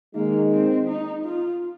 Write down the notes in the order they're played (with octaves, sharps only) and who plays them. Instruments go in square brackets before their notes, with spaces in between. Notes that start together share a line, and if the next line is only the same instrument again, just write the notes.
[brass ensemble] D#3 G#3 D#4 [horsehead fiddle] A#3
[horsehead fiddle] C4
D#4
F4